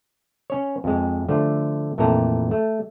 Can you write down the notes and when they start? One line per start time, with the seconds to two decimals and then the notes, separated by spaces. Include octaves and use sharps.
0.50 C#4 C#5
0.84 F2 G#3
1.29 D3 F3 A3
1.98 F2 A#2 E3 A3 A5 A#5
2.51 A3